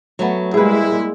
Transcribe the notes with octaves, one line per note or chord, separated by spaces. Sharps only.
F#3 A3 B3
G3 G#3 A#3 E4 G#4 B4